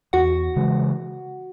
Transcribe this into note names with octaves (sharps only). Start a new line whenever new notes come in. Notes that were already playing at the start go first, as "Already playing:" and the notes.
E2 F#4 F#5
C#3 E3 G#3